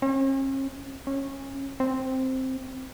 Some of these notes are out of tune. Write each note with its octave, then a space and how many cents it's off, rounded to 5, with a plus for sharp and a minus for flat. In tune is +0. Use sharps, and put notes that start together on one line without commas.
C#4 -45
C#4 -25
C4 +0